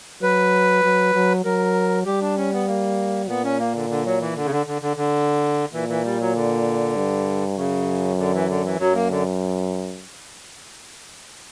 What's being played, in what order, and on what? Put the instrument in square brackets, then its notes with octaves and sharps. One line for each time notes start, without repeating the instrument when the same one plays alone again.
[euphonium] F#3 [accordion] B4
[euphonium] F#3
F#3
[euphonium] F#3 [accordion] A#4
[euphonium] G3 [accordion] G4
[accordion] D4
C#4
B3
A#3
[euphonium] A#2 [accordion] B3
[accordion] C#4
A#3
D3
D3
F#3
E3
D3
C#3
D3
D3
D3
D3
[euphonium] A#2 [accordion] E3
[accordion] E3
G3
F#3
D3
[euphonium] G2
[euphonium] F#2 [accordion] C#3
[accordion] D3
E3
D3
E3
[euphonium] F#2 [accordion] F#3
[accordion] A#3
D3